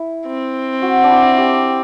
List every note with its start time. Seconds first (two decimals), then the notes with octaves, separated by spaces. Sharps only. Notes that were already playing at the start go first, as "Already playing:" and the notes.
Already playing: E4
0.27 C4
0.82 F#4
1.04 D4
1.10 E4
1.38 G4